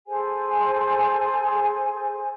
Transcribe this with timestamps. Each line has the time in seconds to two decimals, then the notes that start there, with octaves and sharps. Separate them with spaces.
0.07 G#4 A4 C5 G#5